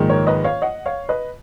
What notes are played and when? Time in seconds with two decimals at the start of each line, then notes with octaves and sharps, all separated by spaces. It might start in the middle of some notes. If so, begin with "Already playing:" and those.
Already playing: A#1 G#2 D#3
0.10 A#4 C#5
0.27 B4 D#5
0.44 C#5 F5
0.62 D#5 F#5
0.86 C#5 F5
1.09 B4 D#5